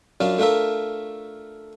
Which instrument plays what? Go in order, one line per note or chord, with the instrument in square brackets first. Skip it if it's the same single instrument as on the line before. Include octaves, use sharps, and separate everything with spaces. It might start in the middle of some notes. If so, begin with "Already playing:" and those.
[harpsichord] F#2 D4 F4 D5
A3 D4 F4 A#4 E5